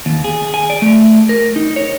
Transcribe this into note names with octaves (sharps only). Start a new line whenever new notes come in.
D#2
G#4
G#5
D5
A3
A#4
D#4
C#5